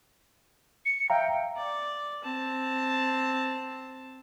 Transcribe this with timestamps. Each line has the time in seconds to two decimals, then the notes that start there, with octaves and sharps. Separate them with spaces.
0.85 C#7
1.10 E5 F5 G5 A#5
1.57 D5
2.23 C4 A5